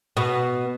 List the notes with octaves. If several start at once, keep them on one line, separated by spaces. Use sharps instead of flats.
B2 B3